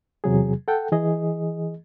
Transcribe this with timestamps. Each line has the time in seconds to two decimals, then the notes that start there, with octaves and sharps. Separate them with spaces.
0.24 E2 C3 F#3 G#4
0.68 A4 F#5 G5
0.92 E3 G#4 D#5